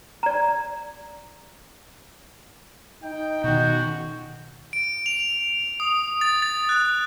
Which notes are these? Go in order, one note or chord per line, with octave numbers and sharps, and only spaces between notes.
D5 A#5
D#4 G5
B2 D#3 F#4 G6
D7
F7
D#6
A6
A6
F#6